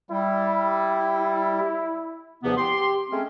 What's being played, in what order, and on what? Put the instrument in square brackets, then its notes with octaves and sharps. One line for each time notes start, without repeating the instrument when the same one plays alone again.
[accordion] G3 [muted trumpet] E4
[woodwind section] E2 G2 C3 F3 B3
G4 C6
G#3 A3 C4 C#4